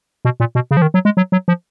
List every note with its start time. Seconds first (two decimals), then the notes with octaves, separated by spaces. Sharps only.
0.25 B2
0.40 A#2
0.55 B2
0.71 C#3
0.77 F3
0.82 D#3
0.94 F#3
1.05 G#3
1.17 F#3
1.32 F#3
1.48 F3